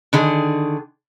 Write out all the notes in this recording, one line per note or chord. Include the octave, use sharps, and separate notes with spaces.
D3 D#3 G#4